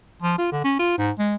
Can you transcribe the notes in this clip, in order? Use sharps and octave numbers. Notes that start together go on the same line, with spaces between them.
F3
F4
D3
C#4
F4
G#2
G#3